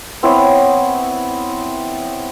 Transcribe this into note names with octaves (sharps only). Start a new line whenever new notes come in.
B3 C4 E4 C#5